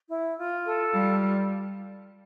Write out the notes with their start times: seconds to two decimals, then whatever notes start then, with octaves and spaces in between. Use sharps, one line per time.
0.09 E4
0.37 F4
0.65 A4
0.93 G3 F4